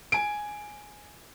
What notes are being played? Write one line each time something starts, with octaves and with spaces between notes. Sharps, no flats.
G#5 D7